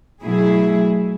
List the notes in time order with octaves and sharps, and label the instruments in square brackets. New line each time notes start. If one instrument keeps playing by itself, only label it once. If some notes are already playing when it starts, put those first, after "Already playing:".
[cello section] B2 F#3 A3 E4 G#4